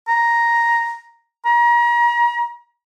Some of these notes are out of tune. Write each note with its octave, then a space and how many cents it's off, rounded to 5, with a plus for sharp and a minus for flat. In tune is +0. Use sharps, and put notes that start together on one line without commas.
A#5 +5
A#5 +35